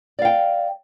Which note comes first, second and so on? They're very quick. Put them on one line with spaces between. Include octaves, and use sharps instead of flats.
D5 F5 G5